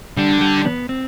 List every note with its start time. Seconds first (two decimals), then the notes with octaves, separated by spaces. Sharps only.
0.17 D3 G3
0.41 G3
0.65 B3
0.89 C4